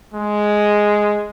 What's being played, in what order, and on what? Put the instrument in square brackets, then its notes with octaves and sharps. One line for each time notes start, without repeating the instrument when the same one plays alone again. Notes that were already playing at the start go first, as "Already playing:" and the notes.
[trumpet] G#3